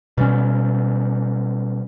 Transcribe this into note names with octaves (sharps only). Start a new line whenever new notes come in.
B2 G3 C#4